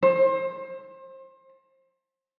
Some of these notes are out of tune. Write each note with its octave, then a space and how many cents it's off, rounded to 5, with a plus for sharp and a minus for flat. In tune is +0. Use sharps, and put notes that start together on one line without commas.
C5 +30